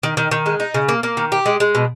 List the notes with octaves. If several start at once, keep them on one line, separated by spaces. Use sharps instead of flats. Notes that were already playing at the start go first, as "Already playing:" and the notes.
D#3
D#3
D#3
G#3
D#4
C#3
A#3
A#3
D#3
G4
G#3
G#3
B2